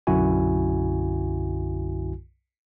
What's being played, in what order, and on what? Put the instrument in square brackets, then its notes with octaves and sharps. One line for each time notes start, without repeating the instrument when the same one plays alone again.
[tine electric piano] B1 F#2 D3 E4 F#4 G#5